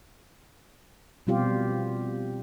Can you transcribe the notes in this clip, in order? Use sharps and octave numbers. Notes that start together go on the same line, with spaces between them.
B2 G3 C4 F4 G4